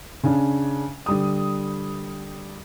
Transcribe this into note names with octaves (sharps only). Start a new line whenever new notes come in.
C#3 C#4 D4
D3 G3 D#6